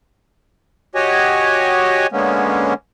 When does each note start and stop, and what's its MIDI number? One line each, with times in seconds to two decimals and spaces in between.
0.95 2.07 66
0.95 2.07 67
0.95 2.07 73
0.95 2.07 75
0.95 2.07 80
2.12 2.74 50
2.12 2.74 56
2.12 2.74 58
2.12 2.74 59
2.12 2.74 61